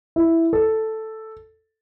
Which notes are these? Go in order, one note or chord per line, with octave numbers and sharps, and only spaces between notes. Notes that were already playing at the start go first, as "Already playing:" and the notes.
E4
A4